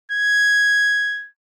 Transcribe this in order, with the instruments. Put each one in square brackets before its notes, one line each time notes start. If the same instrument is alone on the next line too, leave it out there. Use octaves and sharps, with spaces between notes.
[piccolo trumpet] G#6